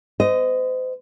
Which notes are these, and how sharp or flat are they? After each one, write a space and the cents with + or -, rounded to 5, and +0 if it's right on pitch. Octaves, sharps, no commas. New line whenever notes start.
C5 -35 D#5 +0